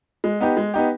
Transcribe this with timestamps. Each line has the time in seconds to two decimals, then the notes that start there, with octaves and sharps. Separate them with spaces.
0.24 G#3
0.40 B3 D#4 G4
0.57 G#3
0.74 B3 D#4 G4